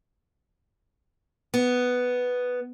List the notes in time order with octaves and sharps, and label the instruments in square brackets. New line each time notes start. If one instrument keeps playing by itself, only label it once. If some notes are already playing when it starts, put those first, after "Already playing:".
[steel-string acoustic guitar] B3